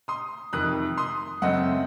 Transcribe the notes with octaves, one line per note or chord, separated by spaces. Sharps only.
C6 D#6
F2 C3 D#3 D#6 F#6
C6 D#6
F#2 C#3 A3 C4 D#5 F#5